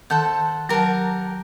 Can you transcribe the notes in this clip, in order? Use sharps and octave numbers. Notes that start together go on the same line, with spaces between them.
D#3 A4 C5 F#5 A5
F#3 G4 A#4 F#5 A5